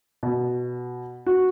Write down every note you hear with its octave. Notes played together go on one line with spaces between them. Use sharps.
B2
F#4